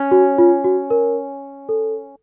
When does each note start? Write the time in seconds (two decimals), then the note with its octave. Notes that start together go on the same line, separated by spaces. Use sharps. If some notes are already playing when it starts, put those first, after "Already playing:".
Already playing: C#4
0.11 F#4
0.38 F4
0.64 F#4
0.90 A#4
1.69 A4